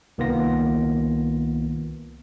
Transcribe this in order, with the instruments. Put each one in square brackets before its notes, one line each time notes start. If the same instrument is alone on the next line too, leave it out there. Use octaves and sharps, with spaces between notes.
[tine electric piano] C2 D#3 A#3 B3 F4 A#6